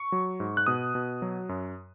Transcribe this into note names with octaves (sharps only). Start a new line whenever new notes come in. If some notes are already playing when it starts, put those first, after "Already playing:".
Already playing: C#6
F#3
G#2
F#6
B2 D#6
B2
F#3
F#2